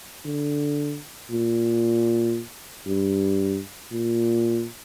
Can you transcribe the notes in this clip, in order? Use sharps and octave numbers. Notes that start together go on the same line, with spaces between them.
D3
A#2
G2
A#2